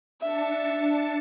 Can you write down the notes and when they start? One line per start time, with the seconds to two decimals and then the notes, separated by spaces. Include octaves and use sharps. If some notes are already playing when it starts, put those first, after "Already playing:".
0.22 D4 E5 A5 C#7